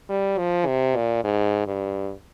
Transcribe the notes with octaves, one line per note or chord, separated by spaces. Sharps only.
G3
F3
C3
A#2
G#2
G2